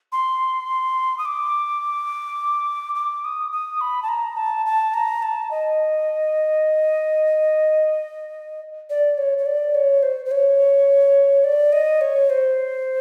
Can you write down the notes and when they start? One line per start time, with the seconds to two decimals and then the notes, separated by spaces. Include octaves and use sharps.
0.12 C6
1.18 D#6
1.25 D6
2.95 D6
3.24 D#6
3.52 D#6
3.81 B5
4.03 A5
4.08 A#5
4.37 A5
4.66 A5
4.94 A#5
5.22 A5
5.51 D#5
8.90 D5
9.18 C#5
9.38 C#5
9.46 D5
9.75 C#5
10.03 C5
10.25 C5
10.31 C#5
11.44 D5
11.72 D#5
12.01 C#5
12.30 C5